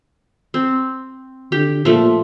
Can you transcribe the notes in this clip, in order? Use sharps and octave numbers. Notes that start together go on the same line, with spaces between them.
C4
D3 G4
A#2 F3 A3